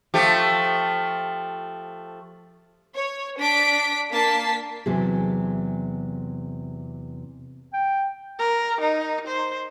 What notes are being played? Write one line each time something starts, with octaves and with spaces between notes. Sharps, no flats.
F3 A3 G4
C#5
D4 B6 D7
A#3 D4 A5 B6 C7
E2 C3 F#3 G#4
G5
A#4
D#4
C5